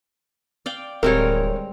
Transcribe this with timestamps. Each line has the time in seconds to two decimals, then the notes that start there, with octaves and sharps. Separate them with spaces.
0.66 D5 F5 G5
1.03 D1 G3 G#3 C4 A#4 C#5